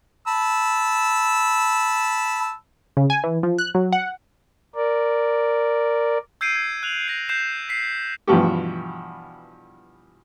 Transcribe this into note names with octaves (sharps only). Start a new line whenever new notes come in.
A5 B5 E6
C#3
G#5
E3
F3
F#6
F#3
F#5
A#4 D5
E6 G6 G#6 C7 D7 D#7
G#6
F#6 F7 F#7
A#6 C7
G6 C7 E7
B6 C7
G2 B2 E3 F3 F#4 G4